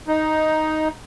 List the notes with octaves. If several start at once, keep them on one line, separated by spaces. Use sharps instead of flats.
D#4